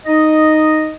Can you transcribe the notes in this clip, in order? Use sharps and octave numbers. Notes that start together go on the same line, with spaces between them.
D#4 D#5